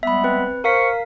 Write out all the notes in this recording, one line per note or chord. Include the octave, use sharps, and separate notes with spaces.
G3 G#3 B3 E5 B5
C4 B4
A#4 C5 F5 C#6 B6